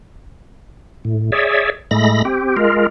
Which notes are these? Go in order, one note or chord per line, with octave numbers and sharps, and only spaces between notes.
A2
G#4 C#5 D5 E5
A2 G#3 A3 B5 A#6
C4 G4
G#3 F4 A#4